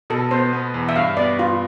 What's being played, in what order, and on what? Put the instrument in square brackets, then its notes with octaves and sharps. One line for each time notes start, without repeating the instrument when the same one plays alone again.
[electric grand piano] B2 [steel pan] A4
[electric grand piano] B3 [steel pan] C5
[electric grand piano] B3
E2
[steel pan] E5
[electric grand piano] G2 [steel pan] F5
[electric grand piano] B3 [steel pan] D5
[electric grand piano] G2 [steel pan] F4